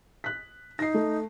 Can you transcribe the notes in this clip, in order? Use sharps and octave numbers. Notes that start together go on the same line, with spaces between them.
F#6 B6
D#4 A#6 C7
A3